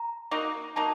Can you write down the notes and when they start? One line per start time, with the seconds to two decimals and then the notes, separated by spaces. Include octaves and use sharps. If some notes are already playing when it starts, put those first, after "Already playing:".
Already playing: A#5
0.31 A#3 D#4 F#4
0.76 A#3 D#4 F#4 A5